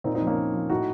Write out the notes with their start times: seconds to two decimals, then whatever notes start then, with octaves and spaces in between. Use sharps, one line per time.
0.04 A#2 C4 D#4
0.15 C4 D#4
0.22 F3
0.27 A#3 C#4
0.38 A#2
0.53 F3
0.70 A2 D#4 F#4